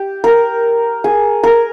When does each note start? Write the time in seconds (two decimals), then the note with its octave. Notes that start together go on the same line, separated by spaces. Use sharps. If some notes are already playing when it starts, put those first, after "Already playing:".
Already playing: G4
0.24 A#4
1.04 G#4
1.43 A#4